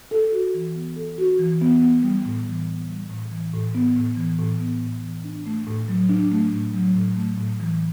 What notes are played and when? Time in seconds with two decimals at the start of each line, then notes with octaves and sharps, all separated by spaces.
0.11 A4
0.32 F#4
0.54 E3
0.75 B3
0.96 A4
1.18 F#4
1.39 E3
1.61 B3
1.82 B3
2.03 G3
2.25 A2
2.46 E3
2.68 B3
2.89 G3
3.10 A2
3.31 E3
3.53 A2
3.74 B3
3.96 A2
4.17 E3
4.39 A2
4.60 B3
4.82 A2
5.02 E3
5.24 D4
5.46 A3
5.67 A2
5.88 F#3
6.09 D4
6.32 A3
6.53 A2
6.74 F#3
6.95 A2
7.16 A3
7.38 A2
7.60 E3